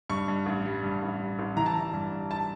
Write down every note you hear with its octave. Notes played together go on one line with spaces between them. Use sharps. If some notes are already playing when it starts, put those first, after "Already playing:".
G2 C#6
G2
A1
G3
G2
A1
G3
A1
E3 A#5
A5
G3 A#5
G2
G2
A5